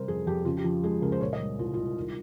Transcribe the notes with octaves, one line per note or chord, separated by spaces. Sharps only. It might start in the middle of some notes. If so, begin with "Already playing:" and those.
Already playing: C3 G3 A#4 C5
F2 G#4
F2 G4
C#3 F4
G4
F3
G#3 G#4
C#2 A#4
C5
A#2 C#5
D#5
G3
C2 F4
C2 F4
D#3